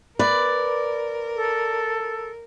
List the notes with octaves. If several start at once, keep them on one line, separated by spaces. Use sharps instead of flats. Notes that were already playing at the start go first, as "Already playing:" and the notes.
A#4 B4 D5
A4